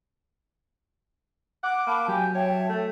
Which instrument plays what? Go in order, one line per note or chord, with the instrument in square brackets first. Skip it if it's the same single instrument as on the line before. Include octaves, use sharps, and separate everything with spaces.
[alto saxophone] F#5 [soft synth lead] D6
[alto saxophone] A#3 [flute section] A5 B5
[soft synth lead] F#3 [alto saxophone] G4 [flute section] G#5
[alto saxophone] C#5 [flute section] E5 G5 A5
[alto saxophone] A3